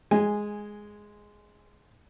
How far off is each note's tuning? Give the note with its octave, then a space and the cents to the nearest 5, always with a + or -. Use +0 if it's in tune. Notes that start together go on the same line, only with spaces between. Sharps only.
G#3 +0 G#5 -10